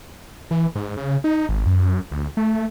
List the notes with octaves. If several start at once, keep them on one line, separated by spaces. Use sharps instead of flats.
E3
G#2
C#3
D#4
G#1
F#2
D2
A3